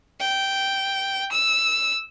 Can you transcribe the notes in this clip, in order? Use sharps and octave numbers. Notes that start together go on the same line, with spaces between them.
G5
E6